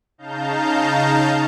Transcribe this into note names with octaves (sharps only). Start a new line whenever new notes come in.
C#3 D#4 F5 A5 A#5 G6